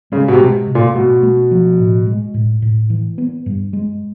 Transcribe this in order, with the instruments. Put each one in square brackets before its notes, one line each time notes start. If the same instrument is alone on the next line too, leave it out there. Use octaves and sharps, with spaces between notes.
[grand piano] C#3 [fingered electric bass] G#3
[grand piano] B2
C3
[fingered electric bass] G#3
C3
[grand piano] A#2
[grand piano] B2 [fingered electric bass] A3
[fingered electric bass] A3
F3
A2
G#3
A2
A2
E3
B3
G2
G#3